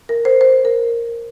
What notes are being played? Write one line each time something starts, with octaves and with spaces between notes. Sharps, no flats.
A#4
C5
C5
A#4